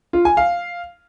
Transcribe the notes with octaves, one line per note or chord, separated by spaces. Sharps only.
F4
G#5
F5